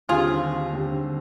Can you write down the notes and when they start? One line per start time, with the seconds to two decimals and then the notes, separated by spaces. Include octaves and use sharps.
0.09 D#2 D3 G3 C4 F4 G#4
0.73 D#2 D3 G3 C4